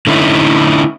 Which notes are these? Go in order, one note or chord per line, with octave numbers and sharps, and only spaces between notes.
D3 A3 C#4 D#4 E4